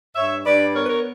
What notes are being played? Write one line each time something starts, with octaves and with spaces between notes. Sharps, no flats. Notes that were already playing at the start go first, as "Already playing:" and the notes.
G2 C#5 E5
G2 B4 D5
B3 A#4 C#5
B4
A#4 C#5